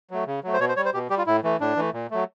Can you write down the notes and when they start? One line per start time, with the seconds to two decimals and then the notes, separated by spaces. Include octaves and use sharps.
0.11 F#3 A3
0.26 C#3
0.44 F#3 A3
0.54 C5
0.60 B2 C#5
0.69 C5
0.76 G3 C#5
0.85 C5
0.94 B2 G4
1.10 G3 G4
1.18 F4
1.27 A2 E4
1.44 E3 A3
1.60 A2 D4
1.76 E3 A3
1.93 A#2
2.11 F#3 A3